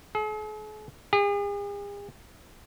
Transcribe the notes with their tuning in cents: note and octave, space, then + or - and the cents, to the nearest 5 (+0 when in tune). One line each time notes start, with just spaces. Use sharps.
G#4 +45
G#4 -45